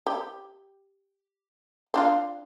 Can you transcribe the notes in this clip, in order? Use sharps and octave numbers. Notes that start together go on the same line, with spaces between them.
G4
C4 D4 F4